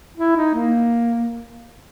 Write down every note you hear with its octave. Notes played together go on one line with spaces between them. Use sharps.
E4
D#4
A#3